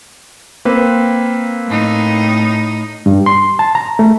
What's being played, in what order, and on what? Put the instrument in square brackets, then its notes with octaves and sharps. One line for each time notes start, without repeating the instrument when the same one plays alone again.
[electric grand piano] A#3 C4 B4
[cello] A2 D#4
[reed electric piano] G2
C6
A5
A#5
A3